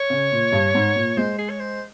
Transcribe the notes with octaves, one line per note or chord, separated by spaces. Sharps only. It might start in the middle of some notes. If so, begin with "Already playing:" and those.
Already playing: C#5
C#3
A#2
G2
G#2
A#2
G#3 C5
G#4
C#5
C5